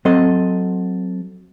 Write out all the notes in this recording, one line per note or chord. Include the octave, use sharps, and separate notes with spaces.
F#3 C4 A4 D#5